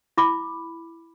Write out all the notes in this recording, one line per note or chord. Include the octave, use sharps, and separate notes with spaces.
E4 B5 D6